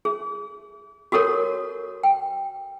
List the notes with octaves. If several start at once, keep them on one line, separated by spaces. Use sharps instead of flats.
G#4
F#4 G4 A4 A#4 C#5
G5